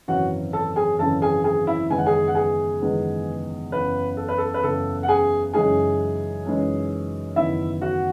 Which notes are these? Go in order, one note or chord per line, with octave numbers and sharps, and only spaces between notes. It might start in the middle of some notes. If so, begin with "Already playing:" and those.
G#1 F#2 C#3 E3 F#4 F#5
A4 A5
G#4 G#5
G#1 F#2 C#3 E3 A4 A5
G#4 G#5
G#4 G#5
E4 E5
F#1 E2 D#3 G#3 B3 G#5
F#5
G#4 G#5
F#5
G#4 G#5
F#1 E2 D#3 G#3 B3
F#1 E2 C#3 B4
A4
B4
A4
B4
F#1 E2 C#3 A4
F#5
G#4 G#5
F#1 F#2 E3 G#3 D#4 G#4 G#5
F#1 F#2 E3 G#3 D#4
F#1 E2 D#3 E4 E5
F#4 F#5